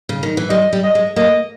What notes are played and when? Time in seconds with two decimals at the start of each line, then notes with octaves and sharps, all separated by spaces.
0.09 C#3
0.23 D#3
0.37 E3
0.50 G3 D#5
0.73 G3
0.84 D#5
0.95 G#3
1.16 A#3 D#5